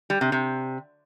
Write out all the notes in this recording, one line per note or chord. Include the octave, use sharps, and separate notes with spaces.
G3
C3
C3